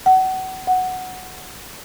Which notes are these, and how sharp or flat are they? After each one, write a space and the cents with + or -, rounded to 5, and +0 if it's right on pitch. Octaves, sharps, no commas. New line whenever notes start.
F#5 +30
F#5 +0